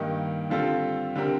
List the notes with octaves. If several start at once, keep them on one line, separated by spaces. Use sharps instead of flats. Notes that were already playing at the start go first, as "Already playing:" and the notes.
Already playing: G2 D#3 A#3 D#4 G4
D3 G3 C4 F4 A4
D3 G3 C4 G4 A#4